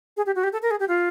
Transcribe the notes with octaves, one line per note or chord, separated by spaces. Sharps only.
G#4
G4
F#4
G4
A4
A#4
G#4
G4
F4